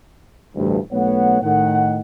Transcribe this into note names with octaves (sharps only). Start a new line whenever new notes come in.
A1 D2 G2
B1 A3 B3 C#5 F#5
A2 D#3 F#5